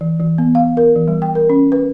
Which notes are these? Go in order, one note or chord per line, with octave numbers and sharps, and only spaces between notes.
E3
E3
B3
F5
A#4
E3
G3
G5
A#4
C#4
B4